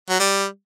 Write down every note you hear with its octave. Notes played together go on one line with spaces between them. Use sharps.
F#3
G3